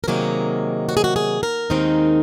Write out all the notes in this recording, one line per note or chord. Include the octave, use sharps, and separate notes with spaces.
A#4
C3 D#3 F#3 A#3 G#4
F#4
G#4
F#4
G#4
A#4
D#2 D#3 G#3 C4 D#4